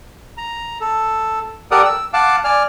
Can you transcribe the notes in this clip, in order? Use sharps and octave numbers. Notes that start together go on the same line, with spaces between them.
A#5
A4
G4 A4 A#4 D5 F#5 D#6
E6
F5 F#5 A5 D6
D5 G#5 F6